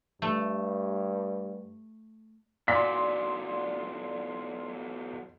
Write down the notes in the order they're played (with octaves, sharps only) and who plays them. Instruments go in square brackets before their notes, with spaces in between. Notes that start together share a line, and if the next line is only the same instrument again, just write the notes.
[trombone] G2 [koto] A3
[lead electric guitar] E2 F#3 [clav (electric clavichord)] A#2 [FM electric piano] D5 C6 [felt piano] B6